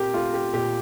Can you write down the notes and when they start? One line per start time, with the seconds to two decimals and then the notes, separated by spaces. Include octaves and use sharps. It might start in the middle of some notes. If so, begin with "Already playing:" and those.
Already playing: A#2 C4 G4 A#4
0.13 A3 F4
0.34 G4
0.53 A#2 G4